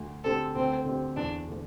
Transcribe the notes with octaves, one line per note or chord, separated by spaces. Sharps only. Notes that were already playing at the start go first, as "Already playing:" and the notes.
Already playing: D2
D3 C4 G4 A4 C5
D2 C4
D3 C4 G4 C5
E2 D4
D3 A3